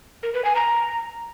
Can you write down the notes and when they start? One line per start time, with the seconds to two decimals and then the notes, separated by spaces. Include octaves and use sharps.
0.23 A#4
0.34 B4
0.45 G#5
0.55 A#5